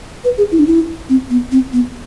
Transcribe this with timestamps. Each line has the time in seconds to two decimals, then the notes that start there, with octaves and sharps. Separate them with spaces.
0.24 B4
0.38 G#4
0.52 E4
0.59 D4
0.67 E4
1.09 C4
1.30 B3
1.52 C4
1.73 B3